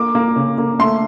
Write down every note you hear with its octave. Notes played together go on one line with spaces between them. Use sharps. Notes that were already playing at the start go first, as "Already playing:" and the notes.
Already playing: A#3 D6
A#3
C#3
A#3
A3 C6